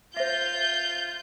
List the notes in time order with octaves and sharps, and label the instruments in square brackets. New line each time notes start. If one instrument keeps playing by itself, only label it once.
[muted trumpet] F4 [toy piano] C5 E5 [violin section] G6